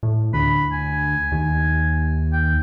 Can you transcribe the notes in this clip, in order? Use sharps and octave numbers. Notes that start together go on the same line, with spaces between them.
A2
D2 B5
G#5
D#2
G5